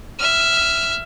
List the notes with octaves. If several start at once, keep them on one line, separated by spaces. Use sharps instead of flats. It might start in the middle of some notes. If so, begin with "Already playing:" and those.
E5 F6